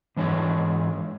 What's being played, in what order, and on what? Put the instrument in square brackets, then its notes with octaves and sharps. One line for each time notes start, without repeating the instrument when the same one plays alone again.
[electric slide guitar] G#2 E3 D4 C#5